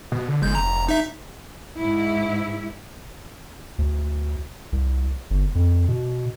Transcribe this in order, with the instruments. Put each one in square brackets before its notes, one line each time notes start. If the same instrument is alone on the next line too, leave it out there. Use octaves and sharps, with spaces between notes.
[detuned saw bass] B2
D3
[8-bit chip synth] G1 G6 [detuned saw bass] G#3
[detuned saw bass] F1 [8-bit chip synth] A#5
[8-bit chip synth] D#4 E5
[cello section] G#2 E4
[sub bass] D2
C2
G1
F2
B2